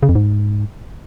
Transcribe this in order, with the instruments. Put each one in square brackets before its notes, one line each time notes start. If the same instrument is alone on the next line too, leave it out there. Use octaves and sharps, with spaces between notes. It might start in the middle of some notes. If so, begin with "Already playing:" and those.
[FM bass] C#3
F2
G#2